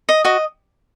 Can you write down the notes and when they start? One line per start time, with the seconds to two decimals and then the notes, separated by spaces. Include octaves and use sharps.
0.09 D#5
0.25 F#4 D#5